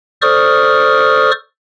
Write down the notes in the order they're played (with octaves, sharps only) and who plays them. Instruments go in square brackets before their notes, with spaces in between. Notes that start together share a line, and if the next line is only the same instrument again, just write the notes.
[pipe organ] A4 C5 D5 C#6 D#6 F6